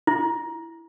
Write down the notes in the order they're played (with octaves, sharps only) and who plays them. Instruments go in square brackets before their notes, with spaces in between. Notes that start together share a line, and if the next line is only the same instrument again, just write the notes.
[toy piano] E4